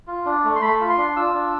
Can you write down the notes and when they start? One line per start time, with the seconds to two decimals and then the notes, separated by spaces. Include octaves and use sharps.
0.07 F4
0.26 D4
0.44 A3
0.56 C6
0.62 A3 B5
0.80 F4
0.90 C6
0.97 D4
1.16 F4 E6
1.34 D4